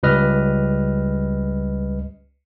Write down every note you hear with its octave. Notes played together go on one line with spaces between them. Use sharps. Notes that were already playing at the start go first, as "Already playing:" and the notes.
C#2 G3 B4 D#5 F6